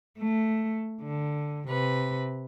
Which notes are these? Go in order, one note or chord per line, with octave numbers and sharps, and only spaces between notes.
A3
D3
C3 B4